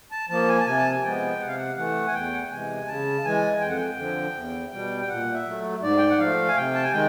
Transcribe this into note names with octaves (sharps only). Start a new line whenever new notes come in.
A5
F3 A#3 A5
G#5
A5
C3 G#5
A5
G#5
F3 G#3 B3 G5
C3 F#5
F5
F#5
E3 A3 F#5
G#5
E2 G5
F#5
G5
C3 E3 G#3 G#5
C#3 A5
E3 G#3 G#5
F2 G5
F#5
G5
D3 F3
E2
B2 G3
G5
A#2 F#5
E5
F#3 A3
G#2 D5
G5
F#5
F3 A3 F5
G#5
C3 G5
A5
G#5
D#3 G#3 G5